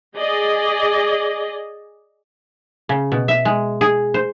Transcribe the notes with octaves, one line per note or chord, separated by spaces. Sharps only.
G#4 D5 D#5
C#3
B2
E5
G#3
G#4
C5